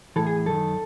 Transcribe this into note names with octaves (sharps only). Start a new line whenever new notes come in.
A2 E3 A4
G#4
F#2 D#3 A4